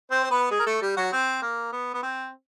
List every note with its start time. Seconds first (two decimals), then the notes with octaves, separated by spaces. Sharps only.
0.11 C4 C5
0.24 C5
0.31 B3 B4
0.51 G#3 G#4
0.60 A#4
0.67 A3 A4
0.82 G3 G4
0.97 F#3 F#4
1.12 C4
1.42 A#3
1.72 B3
1.94 B3
2.03 C4